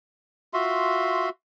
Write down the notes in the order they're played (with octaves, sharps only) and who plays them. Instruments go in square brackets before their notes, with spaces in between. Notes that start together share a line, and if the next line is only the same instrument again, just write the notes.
[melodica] F4 F#4 E5 C6